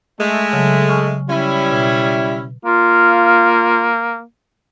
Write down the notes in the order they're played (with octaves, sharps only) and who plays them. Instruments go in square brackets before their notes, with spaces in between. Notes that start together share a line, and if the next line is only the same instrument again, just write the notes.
[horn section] G#3 A3
[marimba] C#3 F#3
G#5 C#6 F6
[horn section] G3 C#4 E4
[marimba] B2
[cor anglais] A#3 [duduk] F4